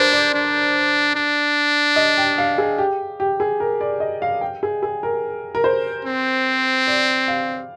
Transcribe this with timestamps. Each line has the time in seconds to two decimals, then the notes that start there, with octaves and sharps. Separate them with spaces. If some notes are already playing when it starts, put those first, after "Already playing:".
Already playing: D4 A#4 C5
0.13 D5
0.34 D4
1.15 D4
1.96 D#5
2.18 G5
2.38 F5
2.58 G#4
2.78 G4
3.20 G4
3.40 G#4
3.60 A#4
3.81 D5
4.00 D#5
4.22 F5
4.41 G5
4.63 G#4
4.83 G#4
5.03 A#4
5.55 A#4
5.64 C5
6.05 C4
6.87 D5
7.28 F5